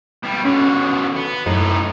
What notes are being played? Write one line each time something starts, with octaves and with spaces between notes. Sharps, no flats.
B2 G3
B2 D3 C#4
B3
F#2 A2 D#4